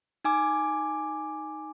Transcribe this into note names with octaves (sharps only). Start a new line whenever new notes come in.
D#4 G#5 D6